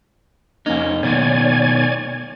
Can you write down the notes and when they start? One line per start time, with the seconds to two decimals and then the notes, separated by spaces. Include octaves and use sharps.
0.66 F2 A#3 C#4 D#4
1.03 B2 D#3 A#3 C#5 D5 G#5